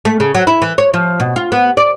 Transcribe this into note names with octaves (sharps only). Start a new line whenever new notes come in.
A3
C#3
F#3
E4
E3
C#5
F3
B2
F4
B3
D5